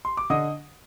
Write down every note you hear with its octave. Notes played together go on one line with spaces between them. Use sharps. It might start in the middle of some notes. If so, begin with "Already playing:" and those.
C6
D6
D3 D#5 D#6